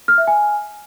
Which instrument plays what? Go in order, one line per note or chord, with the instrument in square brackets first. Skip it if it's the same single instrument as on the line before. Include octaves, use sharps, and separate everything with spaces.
[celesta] F6
E5
G#5